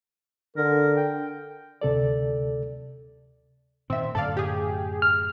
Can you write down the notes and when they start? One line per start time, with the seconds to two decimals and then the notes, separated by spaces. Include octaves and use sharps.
0.57 D3 A#4
0.97 G5
1.81 D2 C3 A4 D5
3.90 A#2 D#3 C4 E5
4.15 F#2 A2 D3 A4 D5 F5
4.37 G4 G#4
5.02 F6